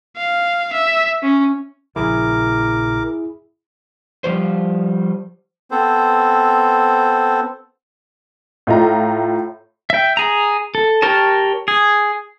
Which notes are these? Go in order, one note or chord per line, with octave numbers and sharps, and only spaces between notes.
F5
E5
C#4
A#1 C#3 F3 E4 G#4 A#4 D6
F3 G3 C5
B3 C4 A4 C5
A2 F4 E5 A#5
E5 G5
G#4 A#5
A4
G4 A#4 C#5 A5
G#4